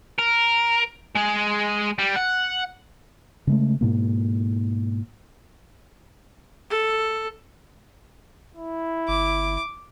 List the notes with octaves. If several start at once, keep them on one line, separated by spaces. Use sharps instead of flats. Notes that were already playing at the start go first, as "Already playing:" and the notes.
A#4
G#3 G#4
G3
F#5
C#3 G#3 A3
G#2 B2 A#3
A4
E4
G1 D6